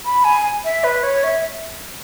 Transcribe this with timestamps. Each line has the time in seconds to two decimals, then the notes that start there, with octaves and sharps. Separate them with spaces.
0.06 B5
0.24 G#5
0.65 E5
0.84 B4
1.03 C#5
1.24 E5